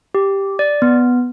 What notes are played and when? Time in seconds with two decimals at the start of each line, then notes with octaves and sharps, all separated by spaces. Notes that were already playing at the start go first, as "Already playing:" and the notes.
0.15 G4
0.59 D5
0.82 B3